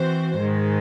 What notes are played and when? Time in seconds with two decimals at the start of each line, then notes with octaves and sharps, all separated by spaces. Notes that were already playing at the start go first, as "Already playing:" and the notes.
Already playing: E3 C4 F#4 C5
0.38 G#2 D#3 G#3